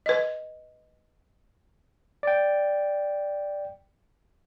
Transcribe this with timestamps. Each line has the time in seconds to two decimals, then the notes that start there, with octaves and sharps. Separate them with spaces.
0.06 B4 D#5
2.23 D5 G5